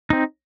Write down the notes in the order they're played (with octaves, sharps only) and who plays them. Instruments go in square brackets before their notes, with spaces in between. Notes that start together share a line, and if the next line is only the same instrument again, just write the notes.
[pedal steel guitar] C4 D#4